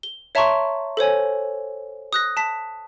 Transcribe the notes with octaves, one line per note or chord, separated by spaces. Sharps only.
G7
C#5 E5 A5 A#5 C6 C#6
A4 C5 C#5 G#5
D#6 F#6 A#6
A5 B6